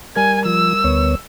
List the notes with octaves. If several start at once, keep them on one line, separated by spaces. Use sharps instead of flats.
G3 A#4 G#5 G#6
F3 E6
D2 B3 C#5